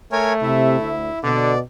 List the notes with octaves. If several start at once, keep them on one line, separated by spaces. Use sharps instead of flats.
A3 A#4 C#5 G#5
C3 E4
D2
B2 D3 D5